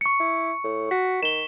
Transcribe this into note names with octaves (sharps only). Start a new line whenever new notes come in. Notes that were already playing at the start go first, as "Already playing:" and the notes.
C#6 C#7
E4
A2
F#4 B6
D#3 E7 G7